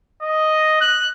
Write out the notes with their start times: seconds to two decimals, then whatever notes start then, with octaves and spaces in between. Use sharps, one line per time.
0.22 D#5
0.81 F#6